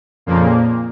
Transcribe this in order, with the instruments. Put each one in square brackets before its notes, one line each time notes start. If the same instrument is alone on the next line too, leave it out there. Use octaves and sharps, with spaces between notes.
[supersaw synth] F2 A#2 C#3 F3 A#3